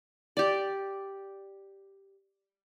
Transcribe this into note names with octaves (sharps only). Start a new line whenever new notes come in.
G4 D5